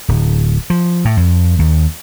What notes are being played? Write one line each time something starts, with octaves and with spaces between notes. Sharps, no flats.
D1
F3
A2
F2
D#2